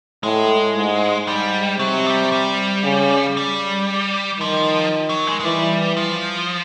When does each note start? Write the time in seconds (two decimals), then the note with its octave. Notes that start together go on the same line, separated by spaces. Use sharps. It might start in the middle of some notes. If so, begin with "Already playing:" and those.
0.23 A2 G#3
0.76 G#2
1.28 G#2 G3
1.79 C3 F#3
2.06 G3
2.32 G3
2.84 C#3
3.37 G3
4.40 D#3 F3
5.09 F#3
5.27 G#3
5.40 G#3
5.45 E3 G3
5.97 F3